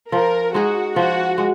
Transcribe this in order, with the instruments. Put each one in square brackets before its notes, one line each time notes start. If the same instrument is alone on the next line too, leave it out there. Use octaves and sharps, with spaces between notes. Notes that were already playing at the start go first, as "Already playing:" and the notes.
[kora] F3 [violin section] A#4
[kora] G#3 D#4 G#4 [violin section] F#4
[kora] F3 [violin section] F#4
[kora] G#3